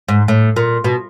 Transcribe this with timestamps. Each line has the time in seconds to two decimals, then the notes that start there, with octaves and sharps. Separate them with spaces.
0.08 G#2
0.28 A2
0.56 A#2
0.84 B2